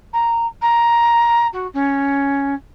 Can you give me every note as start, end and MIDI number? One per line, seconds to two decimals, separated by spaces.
0.13 0.47 82
0.62 1.47 82
1.53 1.67 66
1.74 2.54 61